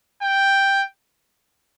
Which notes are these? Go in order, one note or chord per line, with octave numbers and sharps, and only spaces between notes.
G5